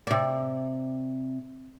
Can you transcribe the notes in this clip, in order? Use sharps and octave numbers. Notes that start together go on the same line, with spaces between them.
C3 D5